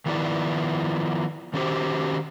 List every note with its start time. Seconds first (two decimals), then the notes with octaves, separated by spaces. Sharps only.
0.06 D#3 F3 B3 E4 D5
1.53 D#3 C#4 F#4 G4 C5